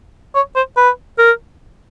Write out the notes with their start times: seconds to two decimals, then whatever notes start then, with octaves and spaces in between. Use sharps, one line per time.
0.35 C#5
0.56 C5
0.77 B4
1.18 A#4